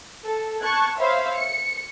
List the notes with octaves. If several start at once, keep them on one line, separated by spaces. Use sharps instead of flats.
A4
A5 C#6 F#6 G#6
C5 C#5 E5 F5 B5
C#7